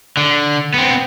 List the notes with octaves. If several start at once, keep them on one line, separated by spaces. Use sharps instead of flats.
D3
B3 C4